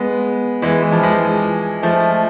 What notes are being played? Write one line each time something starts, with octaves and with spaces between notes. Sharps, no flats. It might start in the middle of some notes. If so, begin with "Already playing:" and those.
Already playing: G#3 B3
E3 G#3
E3
F3
E3 G#3
F3 A3